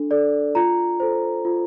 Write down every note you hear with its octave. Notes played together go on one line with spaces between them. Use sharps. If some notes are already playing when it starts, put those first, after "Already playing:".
Already playing: D4 A4
A4 D5
F4 A#5
A4 C5
F4